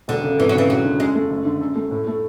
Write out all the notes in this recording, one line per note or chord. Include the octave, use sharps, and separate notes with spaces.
E1 D3
C#3
G#1 E3
F#3
C#3 E3
E1 F#3
D3
F#2 G#3
A3
F#1
D3
F#2
A3
A2
A3